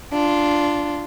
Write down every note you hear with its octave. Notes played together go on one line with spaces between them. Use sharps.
D4 F4